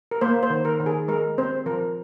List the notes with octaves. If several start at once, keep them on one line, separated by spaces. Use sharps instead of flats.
A#4
A#3 C5
C5
D#3
A#4
D#3
G#4
G#3 A#4
C4 C5
F3 A#4